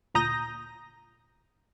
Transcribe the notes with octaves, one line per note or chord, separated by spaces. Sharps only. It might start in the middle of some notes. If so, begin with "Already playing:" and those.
D2 A#2 A#5 D#6 G6 A#6